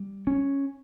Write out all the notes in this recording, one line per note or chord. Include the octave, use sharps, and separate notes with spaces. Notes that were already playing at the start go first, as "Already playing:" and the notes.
Already playing: G3
C#4